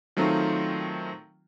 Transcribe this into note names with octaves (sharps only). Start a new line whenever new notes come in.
D#3 F#3 A3 C4 D#4 F4